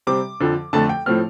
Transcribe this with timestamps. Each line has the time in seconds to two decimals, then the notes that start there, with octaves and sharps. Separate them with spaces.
0.07 C3 G3 C4 D6
0.40 F2 D3 F3
0.73 F2 D3 A3 A5
0.89 G5
1.06 A2 F3 A3 C4 F6